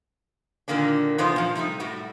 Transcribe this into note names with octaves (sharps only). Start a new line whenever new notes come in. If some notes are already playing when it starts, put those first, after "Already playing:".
A#2 D3 D#3 A#3 D4
E2 C3 B3 D#4 F4 C5
A#2 F3
C3 G3 A3 D#4
A2 G3 F#4